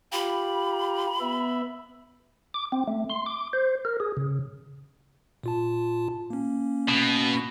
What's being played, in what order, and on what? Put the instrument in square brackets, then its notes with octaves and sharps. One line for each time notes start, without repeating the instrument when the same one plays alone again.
[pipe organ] F4 G4 [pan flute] B5
[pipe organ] B3 E5
[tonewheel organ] D6
C4
A3
C6
D6
C5
A#4
G#4
C#3
[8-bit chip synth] A#2 F4 A5
A#3 C#4
[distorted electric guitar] B2